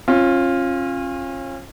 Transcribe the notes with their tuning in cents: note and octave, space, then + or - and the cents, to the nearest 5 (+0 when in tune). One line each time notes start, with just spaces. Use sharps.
C#4 -35 F4 +0